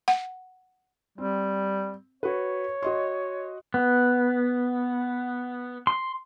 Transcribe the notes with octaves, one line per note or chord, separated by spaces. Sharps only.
F#5
G3 C4
F#4 B4 C#5
F#4 D#5 C6
B3
C6